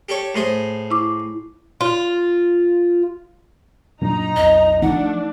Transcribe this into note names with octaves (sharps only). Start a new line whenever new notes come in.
G4 A4 C#5
A2 G#4 C5
E4 C#6 D6
F4
F#2 A#2 D4 D#4 A#5
B1 F2 D#5
F3 A3 D4 D#4 F#5